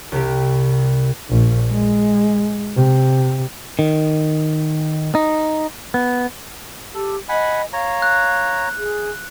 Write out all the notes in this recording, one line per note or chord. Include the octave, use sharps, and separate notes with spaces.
C2 C3 G4
A#1
G#3
C3
D#3
D#4
B3
G4 A4
D#5 F#5 G#5 B5
C#5 F5 A#5
F#6
G#4